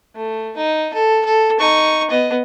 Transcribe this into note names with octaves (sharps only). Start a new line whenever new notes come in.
A3
D#4
A4
A4
D#4 C#6
B3 D#5